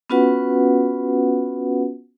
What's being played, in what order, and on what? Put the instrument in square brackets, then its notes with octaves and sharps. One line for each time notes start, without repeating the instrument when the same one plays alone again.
[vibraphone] B3 C#4 F4 F#4 B4 F#5